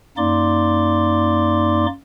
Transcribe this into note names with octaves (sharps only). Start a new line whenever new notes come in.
F#2 A#3 D#4 D5 C6 D6